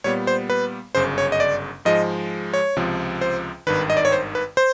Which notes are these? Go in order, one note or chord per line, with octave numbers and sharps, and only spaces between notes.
A#2 G3 B3 C#5
C5
B4
G1 F#2 C#3 C5
C#5
D#5
D5
G#2 F3 G#3 D#5
C#5
C#2 C3 F3
C5
G#1 G2 D#3 B4
D#5
D5
C#5
C5
B4
C5